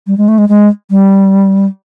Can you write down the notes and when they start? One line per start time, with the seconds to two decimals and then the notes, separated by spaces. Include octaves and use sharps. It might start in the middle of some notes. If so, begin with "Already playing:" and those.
0.07 G3
0.18 G#3
0.28 A3
0.38 G#3
0.49 G#3
0.91 G3